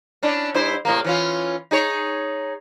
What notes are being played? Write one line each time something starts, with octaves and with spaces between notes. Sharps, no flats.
C#4 D4 E4
G2 E4 C5
A2 C3 A#3
E3 C#4 F4
D#4 G#4 C#5